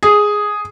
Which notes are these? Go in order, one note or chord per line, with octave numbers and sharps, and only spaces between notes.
G#4